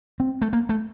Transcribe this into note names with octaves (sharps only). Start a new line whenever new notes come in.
C4
A3
A#3
A3